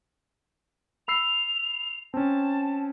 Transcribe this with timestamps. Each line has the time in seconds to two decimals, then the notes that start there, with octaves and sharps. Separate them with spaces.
1.08 B5 E6 C7 F7
2.14 C4 C#4 A5